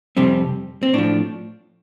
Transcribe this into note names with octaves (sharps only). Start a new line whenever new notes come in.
F2 C3 G3 C4
C4
A2 F3 D4